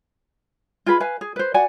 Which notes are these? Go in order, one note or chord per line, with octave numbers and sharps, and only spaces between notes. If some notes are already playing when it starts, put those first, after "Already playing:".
F4 G#4 B4 B5
B4 F5 G#5
G#4
B4 C5
F#4 D5 F#5 G#5